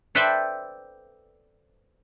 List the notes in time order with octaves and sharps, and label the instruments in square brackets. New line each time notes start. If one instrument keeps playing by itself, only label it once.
[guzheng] A4 B4 C5 D5 E5 G5